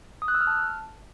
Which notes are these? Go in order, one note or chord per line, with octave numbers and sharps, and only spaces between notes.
D#6
F#6
E6
F6
A5